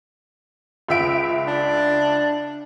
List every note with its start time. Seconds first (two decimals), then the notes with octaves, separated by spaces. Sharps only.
0.88 C#2 E5 D7
1.47 D4